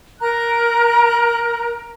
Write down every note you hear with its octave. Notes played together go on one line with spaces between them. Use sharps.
A#4 A#5 F#6